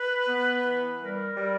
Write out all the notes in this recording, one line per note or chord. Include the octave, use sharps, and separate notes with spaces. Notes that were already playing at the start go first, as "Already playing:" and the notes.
Already playing: B4
B3
E3
G3 A#4
G3